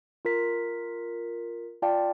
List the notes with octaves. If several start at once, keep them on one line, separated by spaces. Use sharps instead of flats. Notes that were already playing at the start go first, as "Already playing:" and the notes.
F4 A#4 B6
F4 D5 F5 G5 A5